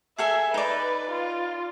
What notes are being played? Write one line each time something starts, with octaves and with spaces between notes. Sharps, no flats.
G#4 A4 E5 G#5
D#4 B4 D5
F4